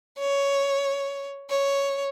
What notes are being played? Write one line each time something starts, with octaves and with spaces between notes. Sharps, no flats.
C#5
C#5